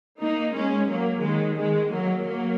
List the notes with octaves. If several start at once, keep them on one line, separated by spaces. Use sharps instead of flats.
A#3 D#4
G#3 C#4
F#3 A#3
D#3 G#3
D#3 G#3
F#3 A#3
F#3 A#3